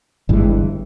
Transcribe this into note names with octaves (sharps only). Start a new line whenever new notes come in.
G1 G2 E3 G#3